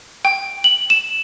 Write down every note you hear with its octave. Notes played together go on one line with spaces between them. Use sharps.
G5
F#7
E7